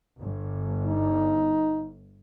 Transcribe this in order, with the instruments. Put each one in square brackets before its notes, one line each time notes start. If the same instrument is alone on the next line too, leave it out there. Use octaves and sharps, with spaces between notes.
[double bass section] G1
[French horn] D#4